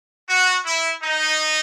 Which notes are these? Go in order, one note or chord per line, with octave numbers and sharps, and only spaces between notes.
F#4
E4
D#4